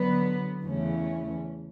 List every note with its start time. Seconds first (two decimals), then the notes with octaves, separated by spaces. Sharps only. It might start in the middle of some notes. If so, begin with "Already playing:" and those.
Already playing: D3 F#3 B3 B4
0.63 E2 C#3 E3 A3 C#4